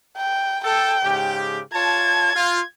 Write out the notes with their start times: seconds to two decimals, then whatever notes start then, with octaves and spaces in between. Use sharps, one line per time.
0.17 G5
0.64 A4 G5
1.05 G#2 C#3 G4
1.74 F4 C#5 A5 G#6
2.35 F4